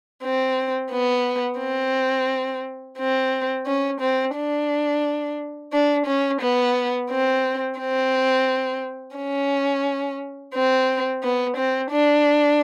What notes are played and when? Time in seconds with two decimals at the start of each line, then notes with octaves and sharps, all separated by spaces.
0.23 C4
0.91 B3
1.60 C4
2.98 C4
3.66 C#4
4.01 C4
4.36 D4
5.73 D4
6.07 C#4
6.41 B3
7.10 C4
7.79 C4
9.16 C#4
10.54 C4
11.23 B3
11.57 C4
11.92 D4